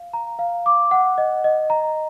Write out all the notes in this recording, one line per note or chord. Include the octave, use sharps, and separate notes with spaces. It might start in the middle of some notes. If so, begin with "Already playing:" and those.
Already playing: F5
A#5
F5
D6
F#5
D#5
D#5
A#5